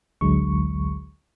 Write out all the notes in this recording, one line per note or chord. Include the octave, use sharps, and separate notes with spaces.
A1 D2 D3 F#3 G#3 C#6